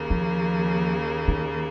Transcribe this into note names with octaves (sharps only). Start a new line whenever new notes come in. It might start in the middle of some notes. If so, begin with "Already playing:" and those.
Already playing: D#2 C#3 A#3
F3
D#3